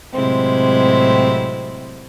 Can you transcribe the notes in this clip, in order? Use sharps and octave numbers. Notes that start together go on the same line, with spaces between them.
A2 C3 F#3 G#3 C4 E4